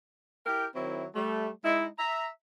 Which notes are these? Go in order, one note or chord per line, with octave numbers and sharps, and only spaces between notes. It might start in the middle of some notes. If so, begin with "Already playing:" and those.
E4 G4 A#4 G5
D#3 F#3 C4 E4
G3 A3
G#3 D#4 E4
E5 A#5